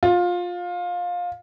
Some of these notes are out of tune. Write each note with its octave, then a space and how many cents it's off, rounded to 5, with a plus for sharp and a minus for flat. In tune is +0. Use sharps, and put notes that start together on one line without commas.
F4 +20